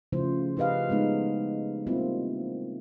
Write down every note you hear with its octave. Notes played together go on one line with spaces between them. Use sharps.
C#3 F3 A3 E4 C5
E4 G4 B4 D#5 F5
G#3 A3 B3 D#4
G3 A#3 C4 E4 F4